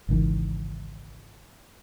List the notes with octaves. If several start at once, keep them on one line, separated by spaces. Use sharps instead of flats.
G#1 C#2 D#3 E3